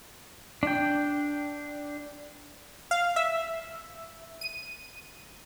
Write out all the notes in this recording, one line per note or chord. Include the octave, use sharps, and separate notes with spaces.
D4 G5
F5
E5
D#7